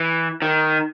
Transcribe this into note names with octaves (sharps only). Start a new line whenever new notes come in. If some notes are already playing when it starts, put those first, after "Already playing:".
Already playing: E3
D#3